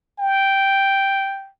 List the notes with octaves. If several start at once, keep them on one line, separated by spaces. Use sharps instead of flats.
G5